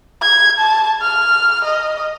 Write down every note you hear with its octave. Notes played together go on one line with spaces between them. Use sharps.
G#6
A5
F6
D#5